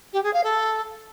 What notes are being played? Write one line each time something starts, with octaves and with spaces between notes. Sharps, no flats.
G4
G#4
F5
A4